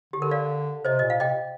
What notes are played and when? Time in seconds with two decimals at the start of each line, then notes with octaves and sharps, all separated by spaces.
0.13 D3 G4
0.22 A#4
0.31 D5 F5
0.85 C3 C5 D#5
0.99 A#2 D#5
1.10 F5
1.20 C3 D#5 G5